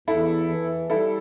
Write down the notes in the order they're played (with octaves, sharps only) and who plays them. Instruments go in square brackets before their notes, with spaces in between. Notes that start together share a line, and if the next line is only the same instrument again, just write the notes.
[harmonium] E2 [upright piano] E4 A4
[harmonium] E3
[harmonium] G3 [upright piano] E4 A4